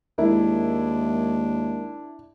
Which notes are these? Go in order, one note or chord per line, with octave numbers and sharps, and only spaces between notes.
D#2 G#3 D4 E4 A#4